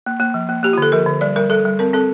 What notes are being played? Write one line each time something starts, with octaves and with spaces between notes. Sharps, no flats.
A#3
A#3
F3
A#3
A#3 G4
F4
D3 A4
F3 A#4
D3
G3 D5
G3 A#4
G3 A4
G3
C4 A#4
C4 A4